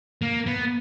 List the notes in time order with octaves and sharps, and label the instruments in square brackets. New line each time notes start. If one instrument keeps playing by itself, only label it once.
[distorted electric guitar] A#3
B3